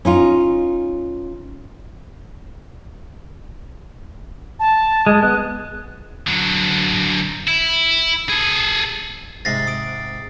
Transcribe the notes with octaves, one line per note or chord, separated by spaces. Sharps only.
C#4 D#4 F4
A5
G#3
B3 F#6
D3 F#3
E4
G#4 A4
G#2 C3 G#3 A6 A#6 C7
D#6 D7